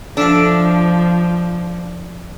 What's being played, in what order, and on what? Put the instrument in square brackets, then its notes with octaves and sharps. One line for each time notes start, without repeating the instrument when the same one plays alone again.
[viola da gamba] F3 [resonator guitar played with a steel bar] D4 [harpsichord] A4 E5 F5